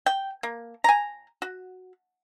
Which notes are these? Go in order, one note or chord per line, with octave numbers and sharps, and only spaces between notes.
G5
A#3
G#5 A#5
F#4